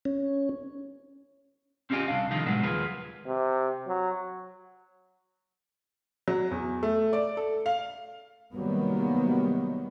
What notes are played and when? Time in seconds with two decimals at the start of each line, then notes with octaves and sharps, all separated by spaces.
0.05 C#4
1.90 C4 C#4 F4 G4 D#5 G#5
2.08 C2 G2 D4 F5
2.30 D3 D#3 F3 D#4 F4
2.46 A#2 F#3 G#3 A#3 B3
2.63 D#2 F3 A#3 G#4 B4
3.26 C3
3.88 F#3
6.28 F#3
6.51 E2
6.83 A3
7.13 D5
7.37 A4
7.66 F5
8.53 C3 D#3 F#3 G3 A#3 B3